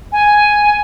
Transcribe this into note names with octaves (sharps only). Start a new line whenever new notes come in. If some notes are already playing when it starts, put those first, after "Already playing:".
G#5